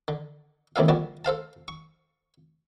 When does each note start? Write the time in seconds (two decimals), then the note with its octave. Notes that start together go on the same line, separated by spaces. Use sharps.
0.08 D3
0.76 A1 D#2 C3 G3 A4 F5
0.88 A#1 D3 G3 F#4 A5
1.25 A4 C5 F5 A5
1.68 C#6